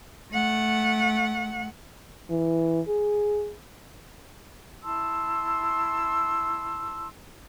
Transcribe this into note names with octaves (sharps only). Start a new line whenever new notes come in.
A3 F#5
E3
G#4
E4 A5 C6 E6